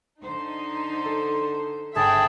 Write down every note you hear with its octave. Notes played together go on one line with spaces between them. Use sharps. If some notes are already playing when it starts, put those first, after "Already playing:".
D3 D#4 C5
A4
G1 G#4 E5 G5 A5 B5